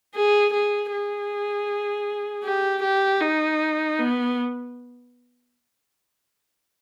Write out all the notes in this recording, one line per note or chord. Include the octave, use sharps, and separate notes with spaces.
G#4
G#4
G#4
G4
G4
D#4
B3